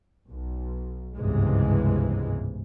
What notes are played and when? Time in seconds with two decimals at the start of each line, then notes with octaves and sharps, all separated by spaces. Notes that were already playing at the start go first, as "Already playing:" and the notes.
0.28 B1
1.14 G1 C#2 G#2 C3 E3 G#3